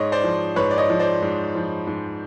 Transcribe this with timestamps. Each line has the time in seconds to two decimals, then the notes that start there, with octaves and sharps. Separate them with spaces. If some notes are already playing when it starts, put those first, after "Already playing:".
Already playing: G#2 C#5 D#5
0.12 C5 D5
0.24 F3
0.56 G#2 B4 C#5
0.71 D5
0.78 C#5 D#5
0.90 F3
0.99 C5 D5
1.22 G#2
1.55 F3
1.87 G#2